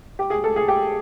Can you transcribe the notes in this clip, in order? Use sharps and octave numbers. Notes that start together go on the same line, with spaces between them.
G4
G#4
A4
G#4
G4